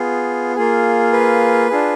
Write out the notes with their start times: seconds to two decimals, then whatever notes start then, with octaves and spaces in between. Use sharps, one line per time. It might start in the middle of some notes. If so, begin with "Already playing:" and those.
Already playing: B3 F4 G#4
0.56 A#3 F4 G#4
1.13 B4
1.70 D4 F4 G#4